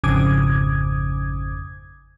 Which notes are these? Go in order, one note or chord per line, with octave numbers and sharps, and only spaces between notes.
G#1 F2 C#3 D6 D#6 G#6